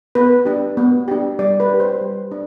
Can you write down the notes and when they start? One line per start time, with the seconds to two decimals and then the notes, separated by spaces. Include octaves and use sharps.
0.15 B3 B4
0.45 D4 G4
0.77 B3
1.08 D4 G4
1.39 G3 D5
1.60 B4
1.69 D4 G4
1.80 C5
2.01 G3
2.31 D4